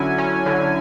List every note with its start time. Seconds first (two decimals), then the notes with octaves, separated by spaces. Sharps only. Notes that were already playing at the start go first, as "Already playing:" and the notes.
Already playing: D3 F#3 C#4 E4 G#5
0.18 C#4
0.46 D3